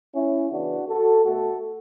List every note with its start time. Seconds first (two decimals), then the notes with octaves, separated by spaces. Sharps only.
0.14 C#4 E4
0.51 C#3 E3 B3 D4 F#4
0.88 F#4 A4
1.25 B2 A3 F#4 A4